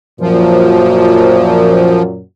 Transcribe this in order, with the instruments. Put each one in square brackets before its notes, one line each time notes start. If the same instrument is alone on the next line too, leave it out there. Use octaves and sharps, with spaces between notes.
[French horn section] F#2 A#2 F#3 [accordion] F3